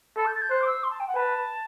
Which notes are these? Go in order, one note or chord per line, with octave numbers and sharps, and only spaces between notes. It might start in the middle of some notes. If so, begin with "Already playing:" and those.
A4 B5
G6
A6
G6
C5 F#6
D6
E6
C6
A5
G5
F#5
B4 A5